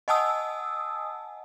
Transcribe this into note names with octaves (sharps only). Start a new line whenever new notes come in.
D#5 F#5 G#5 A5 D#6 E6